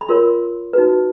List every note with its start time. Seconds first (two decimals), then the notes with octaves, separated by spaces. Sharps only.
0.01 B5
0.09 F4 A#4 C#5 C6
0.73 D#4 F#4 B4